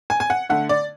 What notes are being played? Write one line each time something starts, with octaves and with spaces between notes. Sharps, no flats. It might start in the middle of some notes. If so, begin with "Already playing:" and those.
G#5
G#5
F#5
D3 A3 F#5
D5